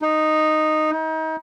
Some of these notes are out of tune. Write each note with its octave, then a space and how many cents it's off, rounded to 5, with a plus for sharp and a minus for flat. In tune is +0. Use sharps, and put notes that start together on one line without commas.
D#4 -5
D#4 +35